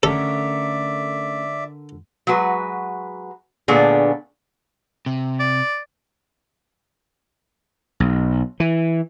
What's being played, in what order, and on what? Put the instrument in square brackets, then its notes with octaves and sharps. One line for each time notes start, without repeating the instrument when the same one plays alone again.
[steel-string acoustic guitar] D3 A#4 [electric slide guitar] A3 C#4 C#5 [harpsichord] A4 [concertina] D5 E5
[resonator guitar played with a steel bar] F#3 G#3 F#4 B4
A#2 D3 A3 B3 D4 G#4
[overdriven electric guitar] C3
[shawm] D5
[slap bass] B1
E3